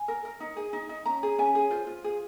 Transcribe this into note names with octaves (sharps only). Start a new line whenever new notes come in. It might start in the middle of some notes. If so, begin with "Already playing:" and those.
Already playing: G#5
A#4
A#4
D#4
G#4
D#4
D#4
C#4 A#5
G#4
C#4 G#5
G#4
F4 C5
F4
G#4